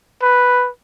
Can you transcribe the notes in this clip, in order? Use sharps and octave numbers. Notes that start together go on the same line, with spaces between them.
B4